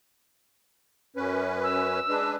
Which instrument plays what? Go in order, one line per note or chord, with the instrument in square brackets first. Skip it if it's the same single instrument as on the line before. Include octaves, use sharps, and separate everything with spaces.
[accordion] F#2 C#4 B4
[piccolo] E6
[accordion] G#3 D4 B4